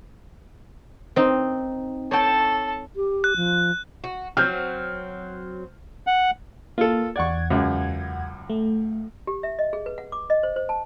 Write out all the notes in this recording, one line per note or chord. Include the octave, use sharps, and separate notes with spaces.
C4 D#4
A4 C#5 G5 A5
G4
F#6
F3
F#4
F#3 C4 F6 G6
F#5
A#3 F4 A4
E2 D5 F#5 C#6 G#6
C#2 F#2
A3
G4
E5
D#5
G#4
B4
F#5
D6
D#5
C5
C5
A5